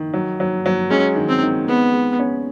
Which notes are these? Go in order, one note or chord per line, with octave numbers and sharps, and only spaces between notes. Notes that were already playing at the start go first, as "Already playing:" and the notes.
Already playing: D#3
F#3
F#3
F#3
G#3 C#4
D#3
C4
D#3
G#3 B3
G#3
C#4